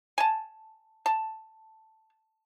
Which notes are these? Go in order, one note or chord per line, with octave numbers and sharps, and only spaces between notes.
G#5 A5
A5